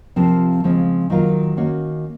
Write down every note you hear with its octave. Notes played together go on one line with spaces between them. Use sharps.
C3 F3 C4 F4 A#4
C#3 F3 G#3 C4
D#3 F#3 A#3 F4 A#4
D#3 A#3 C#4 F#4